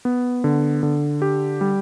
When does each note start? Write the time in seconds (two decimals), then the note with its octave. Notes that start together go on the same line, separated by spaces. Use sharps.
0.05 B3
0.44 D3
0.83 D3
1.22 G4
1.61 G3